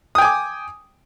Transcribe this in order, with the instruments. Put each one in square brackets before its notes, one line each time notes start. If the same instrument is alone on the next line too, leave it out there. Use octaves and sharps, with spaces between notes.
[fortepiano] D#6
G5
G#5
D6